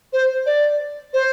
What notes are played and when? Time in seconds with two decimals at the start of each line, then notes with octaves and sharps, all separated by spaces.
0.13 C5
0.46 D5
1.14 C5